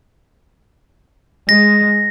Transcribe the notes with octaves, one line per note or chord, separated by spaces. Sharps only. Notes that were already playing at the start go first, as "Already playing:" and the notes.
G#3 A#6